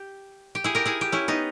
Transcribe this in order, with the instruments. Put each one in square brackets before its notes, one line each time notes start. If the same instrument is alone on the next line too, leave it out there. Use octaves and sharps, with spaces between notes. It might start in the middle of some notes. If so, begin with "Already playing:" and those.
Already playing: [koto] G4
G4
E4 G#4
G4 A#4
E4 G#4
G4
C#4 E4
B3 D#4